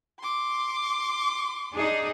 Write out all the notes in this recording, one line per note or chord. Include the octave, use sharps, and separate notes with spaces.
C6 D6
D4 D#4 G#4